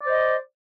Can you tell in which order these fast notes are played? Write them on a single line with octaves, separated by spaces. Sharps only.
D5 C5 D#5